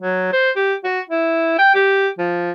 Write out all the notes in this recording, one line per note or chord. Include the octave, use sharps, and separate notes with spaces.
F#3
C5
G4
F#4
E4
G5
G4
F3